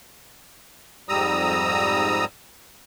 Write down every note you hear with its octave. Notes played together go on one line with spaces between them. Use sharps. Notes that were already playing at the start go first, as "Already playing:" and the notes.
F2 G#2 G3 A#5 D#6 E6